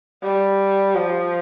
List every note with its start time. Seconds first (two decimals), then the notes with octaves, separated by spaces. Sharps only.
0.23 G3
0.95 F3